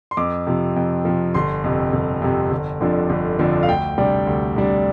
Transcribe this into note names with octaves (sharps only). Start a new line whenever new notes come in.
C6
F2 D6
C3 F3
F2
C3 F3
G1 C6
F2 C3
G1
F2 C3
G1
F2 D3 F3 D4
G1
F2 D3 F3 D4
F5
D2 G5
C3 G3 D4
D2
C3 G3 D4